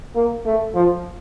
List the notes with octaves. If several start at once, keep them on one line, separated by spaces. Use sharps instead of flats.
A#3
A3
F3